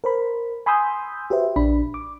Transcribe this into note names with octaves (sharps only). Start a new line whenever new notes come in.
A#4 C5 B5
G#5 B5 C6 D#6 E6 G6
F#4 G4 B4 C5 E5
A#1 D4 B5
D6